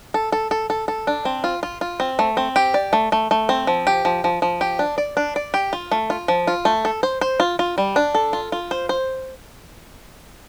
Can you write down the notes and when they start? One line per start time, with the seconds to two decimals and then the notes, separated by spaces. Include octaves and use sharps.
0.14 A4
0.32 A4
0.51 A4
0.70 A4
0.88 A4
1.07 D4
1.25 C4
1.44 F4
1.63 F4
1.81 F4
2.00 C4
2.19 A3
2.37 C4
2.56 G4
2.74 D5
2.93 A3
3.12 A3
3.31 A3
3.49 C4
3.67 F3
3.87 G4
4.05 F3
4.24 F3
4.42 F3
4.61 G4
4.79 D4
4.98 D5
5.17 D4
5.36 D5
5.54 G4
5.73 F4
5.91 A3
6.10 F4
6.28 F3
6.47 F4
6.65 A3
6.85 A4
7.03 C5
7.21 C5
7.40 F4
7.59 F4
7.78 G3
7.96 D4
8.15 A4
8.33 F4
8.52 F4
8.71 C5
8.89 C5